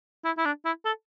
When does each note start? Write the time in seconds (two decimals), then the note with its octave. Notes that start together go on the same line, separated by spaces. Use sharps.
0.25 E4
0.38 E4
0.45 D4
0.65 E4
0.85 A4